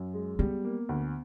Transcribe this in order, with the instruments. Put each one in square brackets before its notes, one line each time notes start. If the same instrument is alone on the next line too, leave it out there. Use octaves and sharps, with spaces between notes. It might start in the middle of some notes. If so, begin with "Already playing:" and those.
Already playing: [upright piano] F#2
G#3
[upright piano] G3 [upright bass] B3
[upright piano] A#3
D2